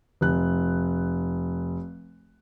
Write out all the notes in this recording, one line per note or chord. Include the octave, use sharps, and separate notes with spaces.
F1 F#6